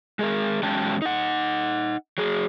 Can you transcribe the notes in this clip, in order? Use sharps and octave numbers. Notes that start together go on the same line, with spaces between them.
G#3 G#4 A#4
E2 F#3 G#3 C#4 G5 A5
D#4 F#5
F#3 G#4